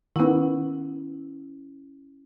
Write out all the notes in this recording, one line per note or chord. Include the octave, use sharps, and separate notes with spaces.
D#3 B3 C#4 E4